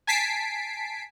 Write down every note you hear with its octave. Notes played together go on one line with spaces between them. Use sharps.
G#5 A5 B6 C7 D7